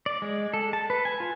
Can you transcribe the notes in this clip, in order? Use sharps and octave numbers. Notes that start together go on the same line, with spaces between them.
D5
G#3
A4
A5
B4
G#5
F4